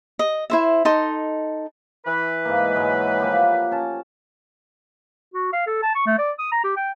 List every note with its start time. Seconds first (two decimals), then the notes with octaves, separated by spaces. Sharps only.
0.19 D#5
0.50 E4 C5 E5
0.85 D#4 A4 D#5 C6
2.06 E3 B4
2.45 G#2 A#3
2.76 G#2 F#3 G#3
3.20 F3 A#3 G4
3.71 C#4 A5
5.34 F#4
5.53 F5
5.67 A4
5.83 A5
5.95 C#6
6.06 A3
6.19 D5
6.39 D#6
6.52 A#5
6.64 G4
6.76 G5